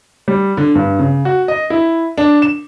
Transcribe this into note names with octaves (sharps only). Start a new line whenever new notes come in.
G3
D3
G2
C#3
F#4
D#5
E4
D4
E7